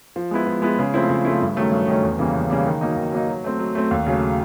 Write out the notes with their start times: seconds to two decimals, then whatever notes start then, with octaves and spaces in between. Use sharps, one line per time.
0.16 F3
0.31 G#3 B3 E4
0.47 F3
0.62 G#3 B3 E4
0.79 C#3
0.94 F3 A3 C4 E4
1.09 C#3
1.25 F3 A3 C4 E4
1.41 G2
1.56 D#3 F#3 A3 C#4
1.72 G2
1.88 D#3 F#3 A3 C#4
2.03 E2
2.19 C#3 E3 G3 A#3
2.34 E2
2.50 C#3 E3 G3 A#3
2.66 D#3
2.81 F#3 A#3 D#4
2.96 D#3
3.12 F#3 A#3 D#4
3.28 F#3
3.44 A3 C4
3.59 F#3
3.75 A3 C4
3.91 D#2
4.06 C#3 F#3 A3